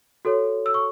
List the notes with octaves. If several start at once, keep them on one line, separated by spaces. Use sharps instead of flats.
F#4 A4 C#5
E6
C#6